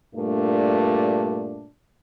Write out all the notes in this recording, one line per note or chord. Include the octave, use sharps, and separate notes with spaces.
G2 A#2 A3 D4